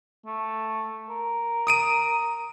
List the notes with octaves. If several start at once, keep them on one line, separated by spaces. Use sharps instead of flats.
A3
A#4
D#6 D7 D#7